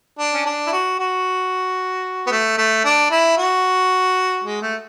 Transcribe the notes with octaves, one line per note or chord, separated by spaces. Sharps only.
D4
C#4
D4
E4
F#4
F#4
B3
A3
A3
D4
E4
F#4
G#3
A3